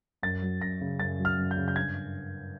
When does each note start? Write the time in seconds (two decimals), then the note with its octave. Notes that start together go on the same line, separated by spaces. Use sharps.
0.23 F#2 A6
0.42 F#3
0.61 F#2 A#6
0.81 C#3
0.99 F#2 A6
1.19 F#3
1.25 F6
1.38 F#2
1.51 G6
1.57 C#3
1.68 G6
1.76 G2 G#6